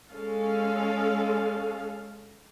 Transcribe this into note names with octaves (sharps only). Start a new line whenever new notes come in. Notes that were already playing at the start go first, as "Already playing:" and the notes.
G#3 C#4 A4 F5